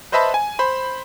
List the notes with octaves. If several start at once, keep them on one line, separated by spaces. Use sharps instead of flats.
B4 C5 D#5 E5 A5 B5
G#5
C5 B5